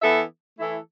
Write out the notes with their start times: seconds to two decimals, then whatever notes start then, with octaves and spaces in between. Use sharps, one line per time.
0.02 E3 B3 A4 E5
0.58 E3 A3 E4 A4 E5